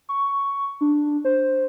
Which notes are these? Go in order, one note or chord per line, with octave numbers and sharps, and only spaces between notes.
C#6
D4
C5